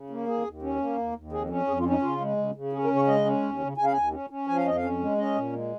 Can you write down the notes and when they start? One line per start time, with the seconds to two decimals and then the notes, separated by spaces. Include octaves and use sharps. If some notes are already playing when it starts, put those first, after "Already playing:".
Already playing: C#3
0.10 A#3
0.27 D#2 G#4
0.45 D#2
0.62 C#4
0.80 A#3
0.98 D#2
1.15 D#2
1.32 F2 G#4
1.50 C#4
1.67 F2 G#4
1.79 F4
1.85 C#4
1.90 D#4
2.02 C#3 F4
2.20 G#3
2.37 C#3
2.55 C#3
2.73 C#4 G#4
2.84 A#4
2.90 C#3
2.96 C#5
3.07 G#3 D#5
3.25 C#4
3.43 D#2
3.60 C#3
3.77 C#3 G#5
3.85 F5
3.92 D#2 G#5
4.12 C#4
4.30 C#4
4.47 F3 G#5
4.57 F5
4.65 F2 D#5
4.76 F5
4.82 C#4
5.00 G#3
5.17 C#4 D#5
5.35 A#2
5.53 G#3